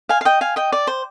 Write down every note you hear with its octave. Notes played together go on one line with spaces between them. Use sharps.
F5 G#5
F5
D#5 G5
F5 G#5
D#5 G5
D5
C5